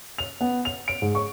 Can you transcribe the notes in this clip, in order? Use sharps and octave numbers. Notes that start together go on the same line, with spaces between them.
F7
B3
F7
D7
G#2
C#6